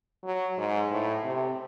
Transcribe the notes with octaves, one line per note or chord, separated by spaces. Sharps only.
F#3
G#2
A2
C3